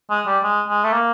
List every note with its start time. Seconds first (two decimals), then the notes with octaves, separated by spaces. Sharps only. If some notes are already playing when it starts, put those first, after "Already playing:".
0.10 G#3
0.26 G3
0.43 G#3
0.68 G#3
0.84 A3
0.92 A#3